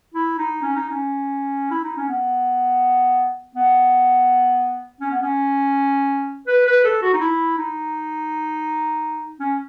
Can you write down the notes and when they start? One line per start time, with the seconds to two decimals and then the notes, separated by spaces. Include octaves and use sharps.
0.14 E4
0.38 D#4
0.62 C#4
0.76 D#4
0.90 C#4
1.71 E4
1.84 D#4
1.97 C#4
2.08 B3
3.55 B3
5.01 C#4
5.11 B3
5.21 C#4
6.47 B4
6.66 B4
6.84 A4
7.02 F#4
7.13 D#4
7.20 E4
7.57 D#4
9.40 C#4